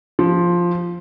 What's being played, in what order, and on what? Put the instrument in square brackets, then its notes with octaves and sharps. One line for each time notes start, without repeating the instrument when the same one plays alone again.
[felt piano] F3